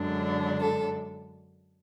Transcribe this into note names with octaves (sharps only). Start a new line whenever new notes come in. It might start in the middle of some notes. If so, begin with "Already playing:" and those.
Already playing: F#2 D3 G#3 D4
A4